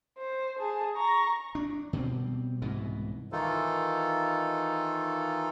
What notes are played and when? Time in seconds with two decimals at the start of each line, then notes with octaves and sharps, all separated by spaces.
0.18 C5
0.59 G#4 A5
0.96 A#5 C#6
1.55 D4
1.93 B2 G3 C4
2.62 C2 G#2 B2 E3
3.32 D#3 E3 D#4 F4 A4